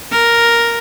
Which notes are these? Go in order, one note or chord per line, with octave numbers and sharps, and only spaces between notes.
A#4